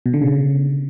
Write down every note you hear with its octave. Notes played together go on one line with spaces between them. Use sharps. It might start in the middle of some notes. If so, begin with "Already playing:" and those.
B2
D3
C#3